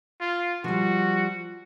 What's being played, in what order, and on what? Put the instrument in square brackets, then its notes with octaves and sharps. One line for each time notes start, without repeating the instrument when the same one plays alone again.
[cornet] F4
[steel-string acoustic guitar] F3 G3 [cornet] F#4